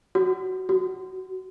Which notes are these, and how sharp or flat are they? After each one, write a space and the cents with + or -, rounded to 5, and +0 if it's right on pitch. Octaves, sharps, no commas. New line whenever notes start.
F#4 +15
F#4 +20